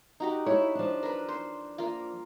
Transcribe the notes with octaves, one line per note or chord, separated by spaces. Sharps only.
D#4 F#4 G4
E4 C#5
F3 D4
A#4 B4
C5
A#3 F4